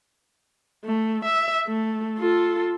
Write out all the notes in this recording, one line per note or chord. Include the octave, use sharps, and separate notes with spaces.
A3
E5
A3
F4 A4